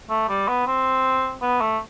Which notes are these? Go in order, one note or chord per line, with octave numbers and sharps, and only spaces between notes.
A3
G3
B3
C4
B3
A3